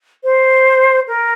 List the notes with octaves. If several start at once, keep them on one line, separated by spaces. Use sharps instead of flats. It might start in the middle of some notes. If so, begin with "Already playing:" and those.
C5
A#4